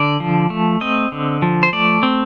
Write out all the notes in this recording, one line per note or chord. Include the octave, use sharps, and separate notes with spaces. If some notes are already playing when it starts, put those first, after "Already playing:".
Already playing: D3 D5
F3
A3
C4 D#5
D3
F3
C5
A3 D5
C4